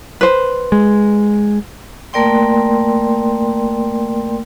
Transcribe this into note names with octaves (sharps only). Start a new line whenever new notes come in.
B4 C5
G#3
A3 A#3 A#4 D5 G5 C6